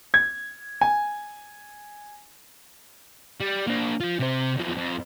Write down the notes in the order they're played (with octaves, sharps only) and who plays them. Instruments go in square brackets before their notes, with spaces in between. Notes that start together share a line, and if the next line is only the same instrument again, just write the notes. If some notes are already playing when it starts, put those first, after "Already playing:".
[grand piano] G#6
G#5
[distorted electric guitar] G3
A#3 D4
F3 F4
C3 C5
E2 F3
F2